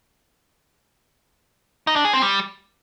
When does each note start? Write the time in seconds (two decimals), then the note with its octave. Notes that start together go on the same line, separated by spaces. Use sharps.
1.87 D#4
1.96 D4
2.05 G#4
2.13 C4
2.22 G3